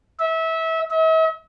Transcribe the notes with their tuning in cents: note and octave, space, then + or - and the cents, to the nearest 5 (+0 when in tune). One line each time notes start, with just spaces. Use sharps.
E5 -25
E5 -45